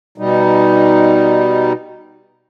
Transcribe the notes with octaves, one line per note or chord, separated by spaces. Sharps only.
B2 G3 D#4